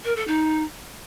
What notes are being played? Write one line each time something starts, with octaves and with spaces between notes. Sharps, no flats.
A#4
A4
D#4